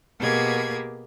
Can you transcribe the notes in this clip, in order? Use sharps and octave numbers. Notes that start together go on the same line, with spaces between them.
B2 A#3 G4 G#4 B5 G#6